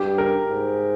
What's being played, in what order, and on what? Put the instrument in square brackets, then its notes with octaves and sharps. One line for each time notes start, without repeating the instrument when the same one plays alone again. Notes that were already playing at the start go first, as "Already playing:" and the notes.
Already playing: [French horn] G2 [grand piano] G4
[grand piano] A#4
[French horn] G#2